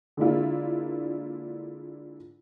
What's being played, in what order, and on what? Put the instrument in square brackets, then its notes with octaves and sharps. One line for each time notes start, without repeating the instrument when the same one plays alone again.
[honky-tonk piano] D3 G#3 A#3 D4 E4 F4